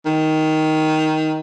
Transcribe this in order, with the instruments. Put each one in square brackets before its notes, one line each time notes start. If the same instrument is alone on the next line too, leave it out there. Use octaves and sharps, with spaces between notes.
[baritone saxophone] D#3